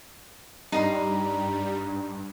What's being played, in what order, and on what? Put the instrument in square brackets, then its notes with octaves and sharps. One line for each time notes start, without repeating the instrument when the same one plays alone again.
[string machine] G2 [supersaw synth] G3 [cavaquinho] D#4 A#5 C6